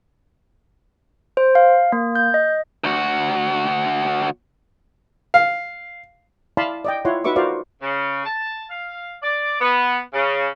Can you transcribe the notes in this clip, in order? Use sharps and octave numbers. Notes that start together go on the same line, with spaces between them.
C5
F5
A#3
G6
D#5
D2 F#4
F5
E4 D5 F5 A5 B5 C6
D5 D#5 G5
E4 F4 C#5 F#5 C6
D#4 F#4 B4 E5 C#6 D6
F4 F#4 A#4 C5 D5 F5
C#3
A5
F5
D5
B3
C#3